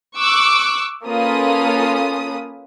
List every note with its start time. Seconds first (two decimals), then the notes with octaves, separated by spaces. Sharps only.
0.17 C#6 D6 E6 F#6
1.04 A#3 C#4 F4 A4 B4 D#6